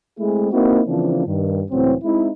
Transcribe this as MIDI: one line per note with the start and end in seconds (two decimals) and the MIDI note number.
0.19 0.50 56
0.19 0.50 57
0.19 0.50 60
0.19 0.50 64
0.19 0.50 68
0.52 0.80 58
0.52 0.80 60
0.52 0.80 63
0.52 0.80 64
0.52 0.80 66
0.86 1.25 49
0.86 1.25 52
0.86 1.25 53
0.86 1.25 58
0.86 1.25 60
0.86 1.25 62
1.26 1.62 43
1.26 1.62 51
1.71 1.94 37
1.71 1.94 45
1.71 1.94 52
1.71 1.94 54
1.71 1.94 60
2.04 2.29 56
2.04 2.29 60
2.04 2.29 63
2.04 2.29 64